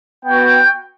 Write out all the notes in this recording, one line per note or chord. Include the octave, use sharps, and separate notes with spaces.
B3 F#4 G5